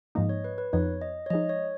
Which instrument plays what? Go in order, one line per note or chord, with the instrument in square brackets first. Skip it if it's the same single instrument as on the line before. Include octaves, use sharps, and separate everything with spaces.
[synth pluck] G#2 F3 A#3 D#4 [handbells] D#5
[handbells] C#5
B4
B4
[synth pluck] F2 F3 B3 D#4 [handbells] C#5
[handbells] D#5
C#5
[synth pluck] F3 G#3 D#4 [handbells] D#5
[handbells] C#5